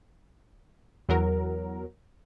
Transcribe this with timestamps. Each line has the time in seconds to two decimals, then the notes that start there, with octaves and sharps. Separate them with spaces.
1.09 E2 F#3 A#4